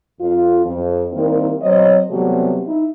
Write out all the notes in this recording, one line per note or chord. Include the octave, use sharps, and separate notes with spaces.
F2 F4
F2
D#3 G3 A#3 C4 E4 A#4
F#3 C4 C5 C#5 D#5
C3 E3 F#3 G3 A3 B3
D#4 E4